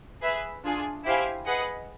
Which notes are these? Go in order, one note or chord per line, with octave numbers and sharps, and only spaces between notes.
G#4 B4 E5
D4 F4 G#4
E4 G4 C5 F5 G#5
G#4 B4 D#5 F#5